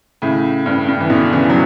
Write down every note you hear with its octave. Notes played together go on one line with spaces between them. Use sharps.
A2 C#3
G2
G2
E3
B2 D3
C#3 E3
F#3